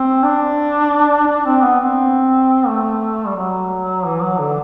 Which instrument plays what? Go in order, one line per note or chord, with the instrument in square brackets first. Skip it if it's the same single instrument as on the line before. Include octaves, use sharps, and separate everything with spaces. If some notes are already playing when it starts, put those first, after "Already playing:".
Already playing: [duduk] C4
D4
D4
C4
B3
C4
A3
G3
F#3
E3
F#3
D3